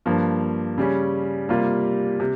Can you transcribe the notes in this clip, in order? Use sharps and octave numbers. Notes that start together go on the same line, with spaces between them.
G2 F3 A#3
C#3 G3 C#4
C3 G3 A#3 F4
C3